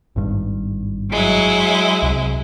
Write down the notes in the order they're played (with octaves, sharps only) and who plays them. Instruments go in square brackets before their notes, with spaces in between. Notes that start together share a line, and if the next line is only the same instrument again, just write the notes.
[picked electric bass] G#1 G2
[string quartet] F#3 G#3 E4
[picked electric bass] C2